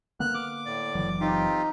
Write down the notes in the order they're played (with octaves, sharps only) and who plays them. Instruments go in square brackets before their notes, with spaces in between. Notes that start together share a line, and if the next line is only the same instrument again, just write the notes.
[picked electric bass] D3 A#3 B3 [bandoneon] F6 [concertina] F#6
[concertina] D6
[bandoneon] A2 D5
[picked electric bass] F#1 E3 F#3
[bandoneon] C4 F4 G4 [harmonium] D#4